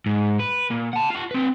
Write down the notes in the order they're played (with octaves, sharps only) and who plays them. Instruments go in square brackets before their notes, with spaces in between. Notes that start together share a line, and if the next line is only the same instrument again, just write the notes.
[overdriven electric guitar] G#2
B4
A#2
F#5 A5
F4 F#5
C4 B4